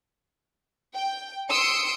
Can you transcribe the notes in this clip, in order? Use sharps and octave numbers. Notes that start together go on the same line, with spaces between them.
G5
C6 D#6 E6 C#7 D7